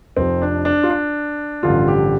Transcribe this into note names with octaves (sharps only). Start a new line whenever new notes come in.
F1 F2 C3 F3 C4
D4
D4
F4
D4
A1 G2 D3 F3 F4
G4